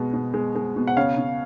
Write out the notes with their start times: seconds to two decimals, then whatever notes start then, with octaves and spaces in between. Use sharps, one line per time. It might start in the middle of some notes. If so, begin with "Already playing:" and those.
Already playing: B2 G#3
0.14 B2
0.34 G#3
0.55 G#3
0.76 B2
0.87 F#5
0.97 C#3 C#5 F5
1.18 C#3